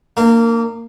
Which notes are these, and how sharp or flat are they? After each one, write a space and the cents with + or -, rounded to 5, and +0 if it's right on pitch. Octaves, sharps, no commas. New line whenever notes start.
A#3 -15 D4 +40